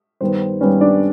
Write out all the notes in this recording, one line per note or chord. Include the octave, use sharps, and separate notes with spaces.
G2 D#3 G3 B3 C5
G2 D#3 G3 B3 C#4 C#5
D4 D5